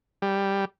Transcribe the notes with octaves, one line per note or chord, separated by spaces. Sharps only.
G3